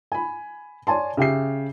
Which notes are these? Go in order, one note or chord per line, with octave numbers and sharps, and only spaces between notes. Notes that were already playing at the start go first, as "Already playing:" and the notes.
G#5 B5
C#5 D5 G#5 A5 C6
C#3 G4 E5 C7